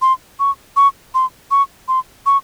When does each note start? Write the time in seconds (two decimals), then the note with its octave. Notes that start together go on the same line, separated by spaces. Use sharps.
0.02 C6
0.40 C#6
0.76 C#6
1.14 C6
1.51 C#6
1.88 C6
2.26 C#6